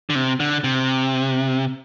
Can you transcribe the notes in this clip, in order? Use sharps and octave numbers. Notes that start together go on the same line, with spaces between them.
D3
C3
D3
C3